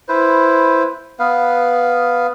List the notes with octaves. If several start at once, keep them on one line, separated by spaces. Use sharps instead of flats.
E4 B4 C5
B3 B4 F5